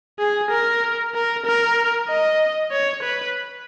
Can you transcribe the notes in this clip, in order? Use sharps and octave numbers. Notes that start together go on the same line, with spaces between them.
G#4
A#4
A#4
A#4
D#5
C#5
B4